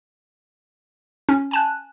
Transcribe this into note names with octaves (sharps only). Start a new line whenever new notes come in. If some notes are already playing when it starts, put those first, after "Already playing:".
C#4
G#5 A5 F#6